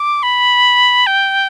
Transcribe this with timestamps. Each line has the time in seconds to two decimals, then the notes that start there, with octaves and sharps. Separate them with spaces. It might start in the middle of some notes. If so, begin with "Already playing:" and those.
Already playing: D6
0.23 B5
1.07 G5